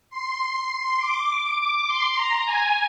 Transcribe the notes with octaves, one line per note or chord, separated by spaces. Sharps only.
C6
D6
C6
A#5
G#5